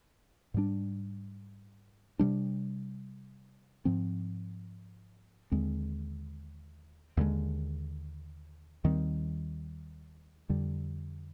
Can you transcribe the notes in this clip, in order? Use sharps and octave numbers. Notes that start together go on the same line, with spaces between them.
G#2 G3 D4
C3 G3 D4
G#2 F3 C4
D#2 D3 G#3 C4
D#2 D3 G#3
D#2 D#3 G3 C4
F2 D3 G3